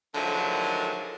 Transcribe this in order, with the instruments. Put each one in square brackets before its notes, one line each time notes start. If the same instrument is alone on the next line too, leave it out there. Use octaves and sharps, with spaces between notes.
[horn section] D3 D#3 F3 F#3 G#3 A3